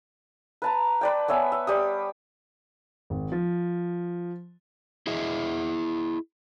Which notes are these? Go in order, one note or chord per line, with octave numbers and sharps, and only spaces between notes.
B4 A5 A#5
B4 D5 G5
B3 C#5 E5 G#5
E5
G3 G4 D#6
G#1
F3
E4 G#4 D#5 E5